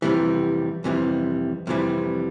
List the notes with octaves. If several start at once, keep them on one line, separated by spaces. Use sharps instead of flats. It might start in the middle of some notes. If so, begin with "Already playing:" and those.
F2 C3 E3 G3
F2 C3 E3 G3
F2 C3 E3 G3